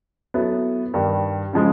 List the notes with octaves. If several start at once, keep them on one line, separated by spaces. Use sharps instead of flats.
F#3 B3 E4 A4
G2 D#3 G3
C#3 F3 G#3